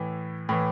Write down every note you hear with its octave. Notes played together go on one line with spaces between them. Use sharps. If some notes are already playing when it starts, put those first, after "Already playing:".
Already playing: A2 E3
A2 E3